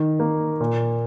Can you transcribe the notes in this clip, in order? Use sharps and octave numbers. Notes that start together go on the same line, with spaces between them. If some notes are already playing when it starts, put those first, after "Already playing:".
Already playing: D#3
A#3
A#2